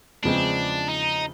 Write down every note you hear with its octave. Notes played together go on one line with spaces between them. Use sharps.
E2 C#3 F3 G#3 C4 D4
D#4